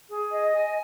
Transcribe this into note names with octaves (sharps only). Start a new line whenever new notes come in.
G#4
D#5
G#5